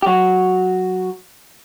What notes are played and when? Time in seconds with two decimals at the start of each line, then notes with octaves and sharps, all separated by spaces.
0.02 G4
0.06 F#3 F#4